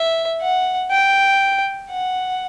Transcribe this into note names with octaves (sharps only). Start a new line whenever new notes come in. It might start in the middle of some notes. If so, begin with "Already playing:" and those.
Already playing: E5
F#5
G5
F#5